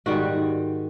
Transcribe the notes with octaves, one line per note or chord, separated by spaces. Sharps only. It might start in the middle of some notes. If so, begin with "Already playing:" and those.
G#2 D#3 G3 F#4